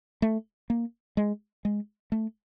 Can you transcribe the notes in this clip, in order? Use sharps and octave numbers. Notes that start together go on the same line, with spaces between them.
A3
A#3
G#3
G#3
A3